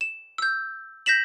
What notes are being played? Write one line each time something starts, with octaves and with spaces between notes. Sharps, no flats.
E7
E6 G6
G6 A#6 B6 E7 F#7